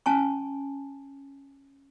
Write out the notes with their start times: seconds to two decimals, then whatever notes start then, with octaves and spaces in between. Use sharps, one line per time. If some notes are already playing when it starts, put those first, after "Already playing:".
0.06 C#4 G#5 A5 C#6